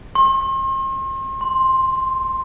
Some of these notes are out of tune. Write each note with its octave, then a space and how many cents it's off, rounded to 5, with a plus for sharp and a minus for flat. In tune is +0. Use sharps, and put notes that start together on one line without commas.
C6 +40
C6 +5